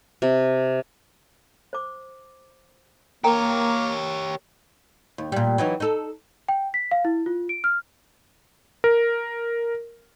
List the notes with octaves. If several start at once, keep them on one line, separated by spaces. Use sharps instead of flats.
C3
C5 D6
A#3 G4 A#4 C#5 G5 A#5
D#2
A#2 G3
E3 F#3 D#4
D#4 A4
G5
B6
F5
E4
F4
D7
F6
A#4